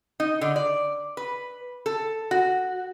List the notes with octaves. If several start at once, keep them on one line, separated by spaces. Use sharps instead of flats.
D#4
D3
D5
B4
A4
F#4